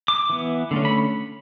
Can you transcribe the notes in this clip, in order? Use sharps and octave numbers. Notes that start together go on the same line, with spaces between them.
D6
E3 B3
D3 A3 C#4
B5